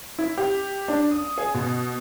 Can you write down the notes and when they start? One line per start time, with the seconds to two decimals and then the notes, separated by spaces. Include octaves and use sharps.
0.19 E4
0.38 G4
0.88 D4
1.11 D#6
1.38 G#4
1.54 B2